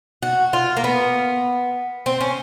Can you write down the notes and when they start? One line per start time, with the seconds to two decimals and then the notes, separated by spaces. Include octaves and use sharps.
0.22 F#4
0.53 F4
0.77 A#3
0.84 B3
2.06 C4
2.21 C#4